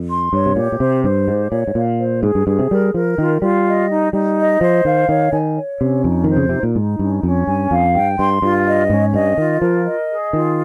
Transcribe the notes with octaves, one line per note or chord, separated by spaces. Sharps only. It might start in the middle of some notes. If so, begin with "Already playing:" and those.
Already playing: F2
C6
G2 C#5
C3
A#2 G4
A#2
C3 C5
G2 C5
G#2 G4
A#2 C#5
G#2
A#2 F5
C5
G#2 G#4
G2
G2 G#4
C3
G3 A#4
F3 A#4
D#3 F4
G3 F4
D#5
D#4
G3 D#4
D#5
F3 C5
D#3 F5
D#3 C#5
D#3 G#5
C#5
C3 C#4
F2 D#4
D#3 C5
C#3
C3 D#4
A#2
G#2 D#4
G2 C#4
F2 C#4
G2 G#5
F2 F5
G2 G5
G2 C6
G2 F4
D#5
G#2 C#4
G2 D#5
D#3 F4
F3 A#4
D#5
G#4
D#3 F4